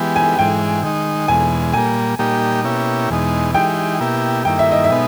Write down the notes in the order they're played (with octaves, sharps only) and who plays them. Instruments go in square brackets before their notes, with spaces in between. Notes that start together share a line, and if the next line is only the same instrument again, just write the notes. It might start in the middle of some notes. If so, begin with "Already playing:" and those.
Already playing: [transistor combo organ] E3 G#3 B3 G4
[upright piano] G#5
[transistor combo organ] G#2 E3 G#3 [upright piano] G5
[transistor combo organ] D#3 G#3 D#4
[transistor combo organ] E2 B2 G#3 [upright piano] G#5
[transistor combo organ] A#2 G3 A#3 [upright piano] G#5
[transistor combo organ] A#2 G3 A#3 D#4 G4
B2 A#3 C#4 E4 G4
E2 B2 G#3 D#4
[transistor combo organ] E3 G#3 D#4 G4 [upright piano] G5
[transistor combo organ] B2 A#3 E4 G4
[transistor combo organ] G2 D#3 A#3 E4 [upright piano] G5
[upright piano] E5
D#5
E5
[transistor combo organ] B2 G#3 B3 D#4